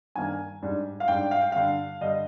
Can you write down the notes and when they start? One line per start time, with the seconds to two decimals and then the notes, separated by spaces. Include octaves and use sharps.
0.15 G2 D#3 A#3 G#5
0.62 G#2 G3 D4
1.00 F5
1.08 G#2 G3 D4 G5
1.31 F5
1.41 G5
1.52 G2 D3 G3 F5
2.01 G2 D3 G3 D#5